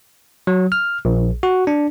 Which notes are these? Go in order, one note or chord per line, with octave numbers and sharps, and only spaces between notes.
F#3
F6
A#1
F#4
D4